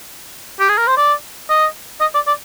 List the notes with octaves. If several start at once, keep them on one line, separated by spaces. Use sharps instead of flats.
G4
G#4
A#4
C5
D5
D#5
D#5
D5
D5